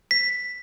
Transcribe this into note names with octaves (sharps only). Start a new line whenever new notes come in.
B6